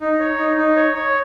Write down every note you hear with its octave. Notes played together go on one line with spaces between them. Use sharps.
D#4
C#5
D#4
D#4
C#5
C#5